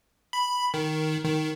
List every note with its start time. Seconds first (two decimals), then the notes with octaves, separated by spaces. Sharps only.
0.33 B5
0.74 D#3
1.24 D#3